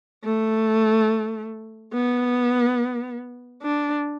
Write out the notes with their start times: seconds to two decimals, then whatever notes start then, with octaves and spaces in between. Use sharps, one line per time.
0.24 A3
1.94 B3
3.63 D4